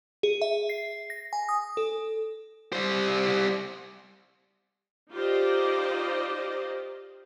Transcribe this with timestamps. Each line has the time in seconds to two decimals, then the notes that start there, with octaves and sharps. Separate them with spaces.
0.23 G#4
0.42 E5
0.69 C7
1.10 A#6
1.33 G#5
1.49 D#6
1.77 A4
2.73 G3 C5
5.12 D#4 F4 G4 C5 D5 D#5